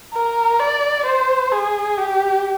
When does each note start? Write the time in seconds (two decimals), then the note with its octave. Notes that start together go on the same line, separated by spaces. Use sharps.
0.14 A#4
0.60 D5
1.06 C5
1.52 G#4
1.98 G4